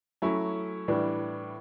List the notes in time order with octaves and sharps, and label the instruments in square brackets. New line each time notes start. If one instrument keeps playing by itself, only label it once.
[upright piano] F#3 A3 C#4 E4
A2 E3 G3 D4